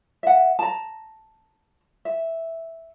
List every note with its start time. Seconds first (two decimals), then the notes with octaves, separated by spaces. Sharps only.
0.23 E5 F#5
0.59 A5 A#5
2.05 E5